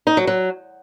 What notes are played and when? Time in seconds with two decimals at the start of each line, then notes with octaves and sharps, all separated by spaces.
0.07 D#4
0.17 F#3
0.27 F#3